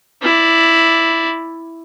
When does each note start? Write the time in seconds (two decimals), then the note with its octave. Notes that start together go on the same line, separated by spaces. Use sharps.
0.22 E4 D5